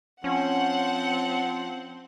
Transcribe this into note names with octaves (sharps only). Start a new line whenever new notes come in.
F3 C4 C#4 F#5